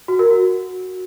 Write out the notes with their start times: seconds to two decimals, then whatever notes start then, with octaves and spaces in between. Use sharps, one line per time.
0.08 F#4
0.19 A#4
0.30 F#4